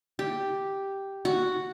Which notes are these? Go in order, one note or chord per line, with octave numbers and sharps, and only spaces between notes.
G4
F#4